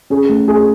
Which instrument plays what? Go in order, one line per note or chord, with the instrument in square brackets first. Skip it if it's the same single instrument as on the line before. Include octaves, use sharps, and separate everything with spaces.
[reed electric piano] C#4 [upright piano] G#4
[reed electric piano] A3
[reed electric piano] A3 [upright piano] G#4